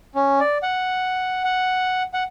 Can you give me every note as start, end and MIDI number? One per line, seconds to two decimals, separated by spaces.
0.15 0.40 61
0.40 0.58 74
0.63 1.42 78
1.44 2.03 78
2.14 2.23 78